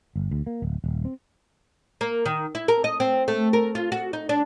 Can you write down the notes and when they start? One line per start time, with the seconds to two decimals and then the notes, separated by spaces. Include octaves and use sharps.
0.16 G1
0.31 D2
0.47 A#3
0.62 D1
0.84 D#1
1.05 C4
2.01 A#3
2.26 D#3
2.55 E4
2.68 A#4
2.84 D#5
3.00 C4
3.28 A3
3.53 A#4
3.75 F4
3.92 F#4
4.13 D#4
4.29 D4